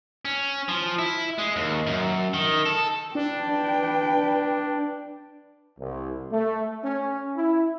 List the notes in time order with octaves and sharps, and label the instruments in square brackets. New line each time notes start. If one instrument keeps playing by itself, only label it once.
[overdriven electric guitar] C#4
F3
E4
G#3
D#2
F#2
D#3
A4
[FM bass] D4 [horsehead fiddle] B4 G5
[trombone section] C2
A3
C#4
E4